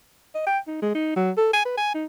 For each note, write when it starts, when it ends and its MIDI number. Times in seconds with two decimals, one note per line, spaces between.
0.35 0.46 75
0.47 0.59 79
0.67 0.79 63
0.82 0.92 56
0.95 1.15 63
1.16 1.31 54
1.37 1.48 69
1.53 1.65 80
1.65 1.74 71
1.77 1.91 80
1.95 2.05 63